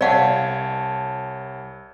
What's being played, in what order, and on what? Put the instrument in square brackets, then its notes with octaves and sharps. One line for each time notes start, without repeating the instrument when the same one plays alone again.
[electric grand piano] C2 C#5 A5 [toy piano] D5 F5 F#5